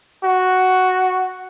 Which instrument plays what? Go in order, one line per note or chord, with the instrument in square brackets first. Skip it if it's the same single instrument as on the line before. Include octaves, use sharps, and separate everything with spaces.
[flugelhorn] F#4